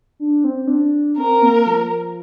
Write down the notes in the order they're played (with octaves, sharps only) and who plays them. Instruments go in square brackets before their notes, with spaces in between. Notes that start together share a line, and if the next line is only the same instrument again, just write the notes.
[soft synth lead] D4
C4
D4
[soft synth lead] C4 [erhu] A#4
[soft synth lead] A#3
F3